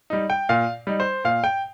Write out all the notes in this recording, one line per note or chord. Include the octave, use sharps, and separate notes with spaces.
G3 D#4
G5
A#2 F5
G3 D#4
C5
A#2 F5
G5